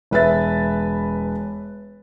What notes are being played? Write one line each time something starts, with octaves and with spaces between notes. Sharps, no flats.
E1 B4 E5 A6